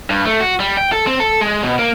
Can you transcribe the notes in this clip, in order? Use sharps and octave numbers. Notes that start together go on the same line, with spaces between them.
G2
A3
F#4
G3
G5
A4
C4
A4
G#3
B2
A#3